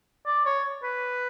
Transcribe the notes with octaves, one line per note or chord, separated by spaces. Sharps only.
D5
C#5
B4